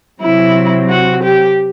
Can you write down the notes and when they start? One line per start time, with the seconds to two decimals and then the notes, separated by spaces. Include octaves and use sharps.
0.21 C3 F#3 C4 E4
0.90 F#4
1.23 G4